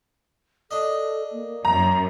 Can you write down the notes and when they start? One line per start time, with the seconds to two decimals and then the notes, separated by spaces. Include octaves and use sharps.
0.71 D4 A4 D#5
1.32 A#3
1.65 F#2 A#5